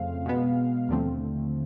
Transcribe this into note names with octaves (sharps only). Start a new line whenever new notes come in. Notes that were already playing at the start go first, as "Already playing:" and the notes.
Already playing: F2 C#3 F3 A3 C4 F5
B2 G#3 B3
D#2 D3 F3 A3 C4